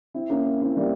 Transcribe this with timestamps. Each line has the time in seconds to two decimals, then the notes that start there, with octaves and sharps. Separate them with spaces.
0.14 C4 E4
0.30 A#3 C#4
0.62 C4 E4
0.77 G3 A#3